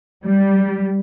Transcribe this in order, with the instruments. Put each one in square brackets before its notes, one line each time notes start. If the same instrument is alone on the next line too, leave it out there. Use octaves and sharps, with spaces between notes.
[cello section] G3